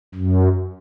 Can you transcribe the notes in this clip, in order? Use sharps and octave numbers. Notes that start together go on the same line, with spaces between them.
F#2